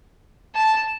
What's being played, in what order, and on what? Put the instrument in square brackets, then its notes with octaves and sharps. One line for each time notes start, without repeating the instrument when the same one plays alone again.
[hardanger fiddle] A5